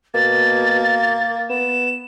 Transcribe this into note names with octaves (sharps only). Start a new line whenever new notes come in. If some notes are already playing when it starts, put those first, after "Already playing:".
B2 A#3 A6
B3 E7